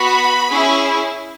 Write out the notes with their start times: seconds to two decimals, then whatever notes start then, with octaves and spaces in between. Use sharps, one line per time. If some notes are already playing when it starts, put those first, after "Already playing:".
Already playing: B3 F#4 B5
0.49 C#4 E4 G#4